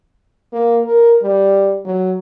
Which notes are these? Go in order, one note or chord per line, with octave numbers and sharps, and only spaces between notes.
A#3
A#4
G3
F#3